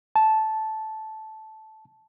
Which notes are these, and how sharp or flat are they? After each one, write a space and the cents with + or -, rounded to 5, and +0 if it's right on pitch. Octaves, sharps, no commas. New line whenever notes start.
A5 -10